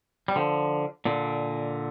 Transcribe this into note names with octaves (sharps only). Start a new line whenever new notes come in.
G3
D3 F3
A#2 D3